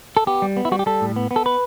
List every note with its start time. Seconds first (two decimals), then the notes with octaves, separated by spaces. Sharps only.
0.17 A4
0.27 B3 G4
0.42 G3
0.57 B3
0.65 E4
0.72 G3 F#4
0.79 G4
0.86 G3 A4
1.01 A2
1.16 B3
1.31 B3
1.36 A4
1.46 B4